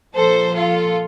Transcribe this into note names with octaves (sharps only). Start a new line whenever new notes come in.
A#2 F3 A4 C5
F4 A4